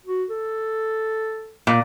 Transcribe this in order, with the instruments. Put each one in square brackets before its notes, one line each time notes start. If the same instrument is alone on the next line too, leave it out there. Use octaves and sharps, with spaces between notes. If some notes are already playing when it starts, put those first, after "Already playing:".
[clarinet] F#4
A4
[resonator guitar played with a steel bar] A#2